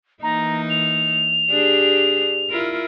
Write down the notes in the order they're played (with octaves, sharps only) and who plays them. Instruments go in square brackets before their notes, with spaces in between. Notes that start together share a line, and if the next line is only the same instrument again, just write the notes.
[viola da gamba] E3 A#3 D#4 [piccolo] A#5
[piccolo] F7
[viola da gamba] D4 G4 G#4
E4 F4 A#4